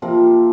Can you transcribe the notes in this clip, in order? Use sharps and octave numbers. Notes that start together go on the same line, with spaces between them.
C3 F3 A#3